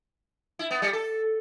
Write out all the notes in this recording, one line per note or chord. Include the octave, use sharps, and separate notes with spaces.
E4
B3
G3
A4